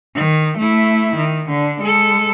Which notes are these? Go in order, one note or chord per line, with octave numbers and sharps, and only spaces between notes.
D#3
A3 E4
D#3
D3 D4
G#3 A4